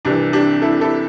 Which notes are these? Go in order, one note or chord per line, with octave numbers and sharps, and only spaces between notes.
C2 C3 E3 D4
D4 G4
E4 A4
E4 A4